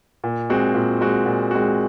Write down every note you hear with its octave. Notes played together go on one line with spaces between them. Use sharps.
A#2
G#3 C4 F#4
A#2
G#3 C4 F#4
A#2
G#3 C4 F#4